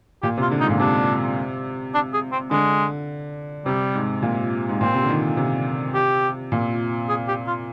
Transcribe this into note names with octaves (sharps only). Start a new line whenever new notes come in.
A#2 G4
C3 F4
D3
G#2 D#4
A#2
C3 D4
D4
G#4
C4
D3 G#3
C3 G3
G#2
A#2
G#2
A#2 C4
C3
D3
D#3
C3
G4
A#2
G#4
G4
F4